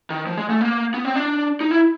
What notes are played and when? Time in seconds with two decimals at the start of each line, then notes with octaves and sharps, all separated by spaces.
0.10 D#3
0.27 F3
0.37 G#3
0.50 A3
0.61 A#3
0.94 B3
1.05 C4
1.16 D4
1.61 D#4
1.71 E4